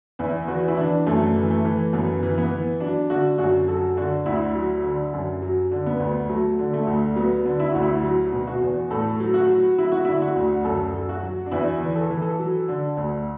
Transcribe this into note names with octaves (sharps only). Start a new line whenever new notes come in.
E2 E4
E3 F#4
E4
E3 D4
F#2 A3
E3
A3
E3
F#2 B3
E3
B3
E3
F#3 D4
D3 F#4
F#2 F#4
F#3 A4
D3 F#4
D2 E4
F#3
D3
F#2
F#3
D3
B3
D2
F#3 A3
D3
A3
D2
F#3 B3
D3
E4
D2 F#4
E4
F#3
B2
F#4
E2
A2 A4
F#3
F#4
F#3
F#3 E4
F#4
D3 E4
F#4
D2
F#2 A4
F#3
F#4
F#3
D4
E2 E4
E3
A4
E3
A4
F#3
D3
D2